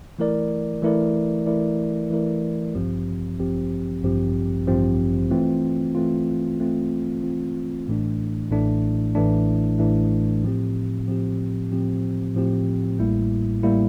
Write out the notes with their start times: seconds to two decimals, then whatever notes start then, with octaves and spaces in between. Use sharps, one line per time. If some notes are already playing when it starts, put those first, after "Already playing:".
0.19 E3 A3 E4 A#4 D5
0.83 E3 A3 E4 A#4 D5
1.47 E3 A3 E4 A#4 D5
2.10 E3 A3 E4 A#4 D5
2.75 A1 G2 F3 C4 G4
3.38 A1 G2 F3 C4 G4
4.02 A1 G2 F3 C4 G4
4.67 A1 G2 F3 C4 G4
5.31 E3 A3 C4 F4
5.95 E3 A3 C4 F4
6.59 E3 A3 C4 F4
7.23 E3 A3 C4 F4
7.87 A1 A2 E3 A3 D4
8.51 A1 A2 E3 A3 D4
9.15 A1 A2 E3 A3 D4
9.79 A1 A2 E3 A3 D4
10.43 A2 F3 C4 G4
11.07 A2 F3 C4 G4
11.71 A2 F3 C4 G4
12.35 A2 F3 C4 G4
12.99 A1 A2 G3 A#3 E4
13.63 A2 G3 A#3 E4